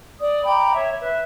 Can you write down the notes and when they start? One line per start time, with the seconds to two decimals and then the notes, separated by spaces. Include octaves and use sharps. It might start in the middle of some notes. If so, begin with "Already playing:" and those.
0.19 D5 D#6
0.45 G5 A#5 B5 D6
0.74 C#5 E5
0.99 B4 E5